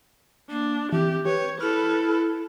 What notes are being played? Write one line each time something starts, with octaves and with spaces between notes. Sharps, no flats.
A#3 D4
E3 C4 G4
G4 B4 C#5
E4 A4 B4 F6